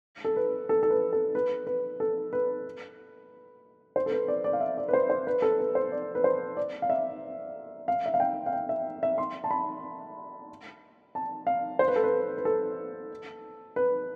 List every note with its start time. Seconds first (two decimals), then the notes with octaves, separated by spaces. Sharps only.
0.25 A4
0.36 B4
0.69 A4
0.83 A4
0.90 B4
1.12 A4
1.35 B4
1.67 B4
2.00 A4
2.33 B4
3.96 C5
4.06 A4
4.11 B4
4.28 D5
4.44 D5
4.53 F5
4.60 E5
4.78 D5
4.88 B4
4.93 C5
5.10 C5
5.27 B4
5.42 A4
5.60 B4
5.75 C5
5.92 D5
6.15 B4
6.24 C5
6.57 D5
6.82 F5
6.90 E5
7.88 F5
8.06 E5
8.14 F5
8.20 G5
8.46 F5
8.53 G5
8.69 E5
9.03 E5
9.18 C6
9.44 A5
9.51 B5
11.15 A5
11.47 F5
11.79 C5
11.88 B4
11.96 A4
12.03 B4
12.38 B4
12.45 A4
13.76 B4